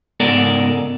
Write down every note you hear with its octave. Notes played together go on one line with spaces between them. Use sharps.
G#2 C#3 B3 A4 A#4 D5